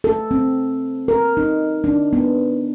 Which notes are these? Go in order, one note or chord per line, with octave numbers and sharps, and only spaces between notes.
A4
C4
A#4
D#4
D4
B3